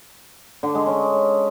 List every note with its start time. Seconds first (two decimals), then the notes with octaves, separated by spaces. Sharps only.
0.63 D3
0.75 G#3
0.87 C#4